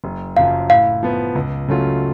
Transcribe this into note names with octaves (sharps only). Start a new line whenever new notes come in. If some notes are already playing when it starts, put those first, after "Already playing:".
F#1
F#2 C#3 F3 F5
A2 F5
F3 B3
C#2
C#3 F#3 A3 F4